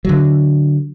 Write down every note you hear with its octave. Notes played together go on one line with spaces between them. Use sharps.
D3 F#3